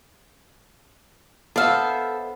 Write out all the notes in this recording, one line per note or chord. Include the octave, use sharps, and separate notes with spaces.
B3 D4 A4 C5 E5 F5